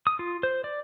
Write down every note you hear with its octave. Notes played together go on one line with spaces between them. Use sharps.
D#6
F4
C5
D5